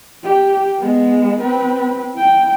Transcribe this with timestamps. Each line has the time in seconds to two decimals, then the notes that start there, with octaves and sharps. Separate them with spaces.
0.23 G4
0.79 G#3 B3
1.40 C4 B4
2.14 E4 G5